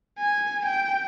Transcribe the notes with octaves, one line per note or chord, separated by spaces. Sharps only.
G#5
G5